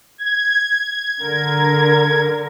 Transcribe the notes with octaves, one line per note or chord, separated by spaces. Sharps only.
G#6
D3 A#4